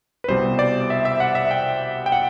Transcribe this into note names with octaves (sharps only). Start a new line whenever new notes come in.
B4
C2 B2 G3 C4 C5
D5
E5
E5
F#5
E5
G5
G5
F#5